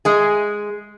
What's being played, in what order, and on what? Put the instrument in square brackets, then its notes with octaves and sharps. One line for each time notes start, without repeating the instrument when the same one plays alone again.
[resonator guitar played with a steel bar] G#3 G#4